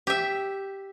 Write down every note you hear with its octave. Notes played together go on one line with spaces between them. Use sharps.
G4 E5